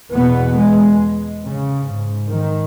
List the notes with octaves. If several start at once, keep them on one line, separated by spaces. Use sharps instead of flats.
E2 B2 B3
G#3
C#3
G#2
D#3